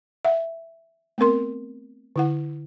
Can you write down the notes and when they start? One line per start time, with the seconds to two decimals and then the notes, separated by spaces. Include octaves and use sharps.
0.25 E5 F#5
1.18 A3 B3 C4 A#4 C6
2.16 D3 E4 F#5